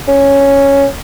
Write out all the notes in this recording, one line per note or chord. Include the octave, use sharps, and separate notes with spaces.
C#4